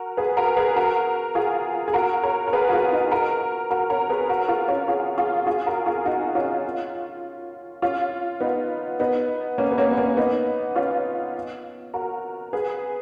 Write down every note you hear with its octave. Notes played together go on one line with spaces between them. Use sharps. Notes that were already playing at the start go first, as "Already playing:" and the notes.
Already playing: F#4 A#4
G#4 B4
F#4 A#4
G#4 B4
F#4 A#4
F4 G#4
G#4
F#4 A#4
A#4 C#5
A#4
G#4 B4
F#4
F4 G#4
D#4 F#4
F#4 A#4
F#4 A#4
A#4 C#5
G#4 B4
F#4 A#4
F4 G#4
C#4 F4
F4 G#4
F4 G#4
F#4
F4 G#4
F#4 A#4
F4 G#4
D#4 F#4
C#4 F4
C#4 F4
B3 D#4
B3 D#4
A#3 C#4
B3
A#3 C#4
B3
A#3 C#4
B3 D#4
C#4 F4
F#4 A#4
G#4 B4